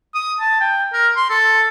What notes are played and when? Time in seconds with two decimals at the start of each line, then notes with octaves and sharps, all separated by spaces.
0.14 D#6
0.40 A5
0.60 G5
0.93 A#4
1.16 C6
1.30 A4